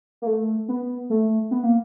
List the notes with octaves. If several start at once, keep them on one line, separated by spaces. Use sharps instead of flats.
A#3
A3
B3
A3
B3
A#3